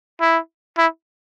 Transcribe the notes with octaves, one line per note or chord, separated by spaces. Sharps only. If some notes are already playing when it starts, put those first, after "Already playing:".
E4
E4